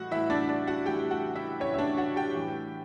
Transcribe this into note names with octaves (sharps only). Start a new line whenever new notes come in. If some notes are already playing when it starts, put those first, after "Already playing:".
Already playing: A2 E3 F#4 F#5
A2 E3 E4 E5
D4 D5
D4 D5
F#4 F#5
A2 E3 G4 G5
F#4 F#5
E4 E5
A2 E3 C#4 C#5
E5
D4 D5
F#4 F#5
G4 G5
A2 E3